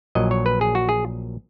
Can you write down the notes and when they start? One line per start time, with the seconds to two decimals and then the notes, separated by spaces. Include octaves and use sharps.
0.15 A#1 A#2 F#3 D#5
0.31 C#5
0.46 B4
0.61 G#4
0.75 F#4
0.89 G#4